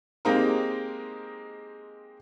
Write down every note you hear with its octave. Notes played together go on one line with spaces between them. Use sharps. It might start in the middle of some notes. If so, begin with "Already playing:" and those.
G#3 A#3 C4 D#4 G4 A#4